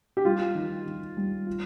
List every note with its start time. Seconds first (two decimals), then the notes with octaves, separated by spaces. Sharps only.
0.17 G4
0.25 G3 F4
0.55 D#3
0.86 D#3
1.17 G3
1.47 F4